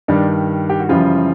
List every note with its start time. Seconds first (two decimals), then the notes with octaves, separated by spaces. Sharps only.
0.08 G2 D#3 G3 D4
0.70 G4
0.80 F#4
0.89 F#2 C#3 E3 F3 G3 F4